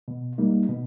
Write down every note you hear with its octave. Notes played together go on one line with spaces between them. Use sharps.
B2
G3 A#3 D#4
B2